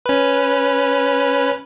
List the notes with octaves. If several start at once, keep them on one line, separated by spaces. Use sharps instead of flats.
C#4 B4